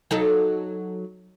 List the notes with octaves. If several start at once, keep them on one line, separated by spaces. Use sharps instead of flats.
F#3 D#4 A4